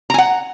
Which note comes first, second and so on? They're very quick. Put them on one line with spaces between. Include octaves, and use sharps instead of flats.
A#5 G#5 F#5